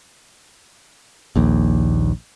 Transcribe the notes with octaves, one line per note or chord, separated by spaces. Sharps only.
A#1 D#2